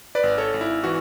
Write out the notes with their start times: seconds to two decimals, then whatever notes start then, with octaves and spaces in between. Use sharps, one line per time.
0.15 B4 D5
0.23 G#1
0.38 A4 C#5
0.54 G#1
0.61 E4
0.84 E3 F#4